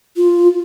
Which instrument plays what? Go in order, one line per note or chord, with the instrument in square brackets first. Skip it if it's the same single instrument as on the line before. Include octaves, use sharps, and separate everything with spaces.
[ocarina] F4